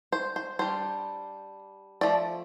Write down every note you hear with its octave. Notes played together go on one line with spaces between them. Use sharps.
C5
C5
G3 D4 C5
F3 A3 D5